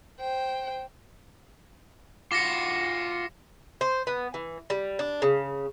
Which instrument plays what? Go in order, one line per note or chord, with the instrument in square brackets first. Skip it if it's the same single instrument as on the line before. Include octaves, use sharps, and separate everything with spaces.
[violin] C5 G5
[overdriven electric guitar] F4 F#4 [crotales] D6 A#6 C#7
[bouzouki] C5
B3
E3
G3
D4
C#3